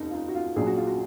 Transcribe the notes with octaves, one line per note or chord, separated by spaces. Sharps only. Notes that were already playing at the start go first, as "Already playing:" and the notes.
Already playing: F1 D#2 D#4
F4
D#4
F#4
F4
A#1 A#2 F#3 G#4
F#4
F4
F#4